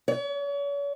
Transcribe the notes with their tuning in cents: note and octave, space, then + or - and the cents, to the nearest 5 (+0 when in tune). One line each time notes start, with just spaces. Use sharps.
C#5 +40